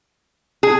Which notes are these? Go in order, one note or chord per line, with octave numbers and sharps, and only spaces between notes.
G#4